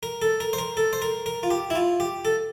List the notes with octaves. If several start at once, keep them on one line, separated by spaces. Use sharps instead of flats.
A#4
A4
A#4
C5
A#4
A4
C5
A#4
A#4
F4
G4
E4
F4
G4
A4